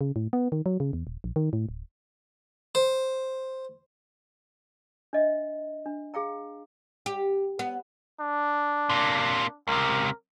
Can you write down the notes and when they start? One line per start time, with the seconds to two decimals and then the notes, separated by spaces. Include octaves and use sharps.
0.01 C#3
0.16 A2
0.33 B3
0.52 D#3
0.66 F#3
0.80 C#3
0.93 E2
1.07 D#1
1.24 A#1
1.36 D#3
1.53 A2
1.69 D1
2.75 C5
5.13 D4 D#5 E5
5.86 D4
6.14 G#4 F5 G5 A#5
7.06 G4
7.59 B3
8.20 D4
8.90 C3 A#3
9.68 C#2 C3 A#4